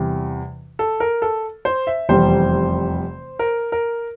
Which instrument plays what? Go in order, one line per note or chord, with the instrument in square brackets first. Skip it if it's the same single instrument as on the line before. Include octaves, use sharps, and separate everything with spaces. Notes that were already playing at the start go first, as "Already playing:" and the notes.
Already playing: [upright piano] E2 C3 G3
[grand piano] A4
A#4
A4
C5
E5
[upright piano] F1 E2 C3 G3 [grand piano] C5
[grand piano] A#4
A#4